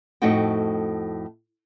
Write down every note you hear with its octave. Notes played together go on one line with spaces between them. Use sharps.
F2 A2 A3 D#4 F#4 G5